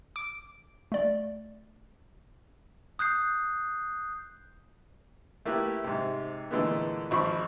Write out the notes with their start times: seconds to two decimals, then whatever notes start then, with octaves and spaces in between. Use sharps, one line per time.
0.16 D6 D7
0.92 A3 D5
2.99 D#6 F#6 G6 C7
5.46 A3 A#3 E4 G4 B4
5.84 G#2 C3
6.51 A#2 D3 E3 G#3 A3 B3
7.11 G#1 F3 B5 C#6